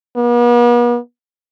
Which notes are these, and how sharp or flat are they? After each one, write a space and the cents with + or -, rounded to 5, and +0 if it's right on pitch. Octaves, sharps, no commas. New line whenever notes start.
B3 -45